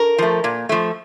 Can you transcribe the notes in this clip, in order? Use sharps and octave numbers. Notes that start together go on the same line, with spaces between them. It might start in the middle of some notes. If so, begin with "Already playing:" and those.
Already playing: A#4
F3 A3
A#2
F3 A3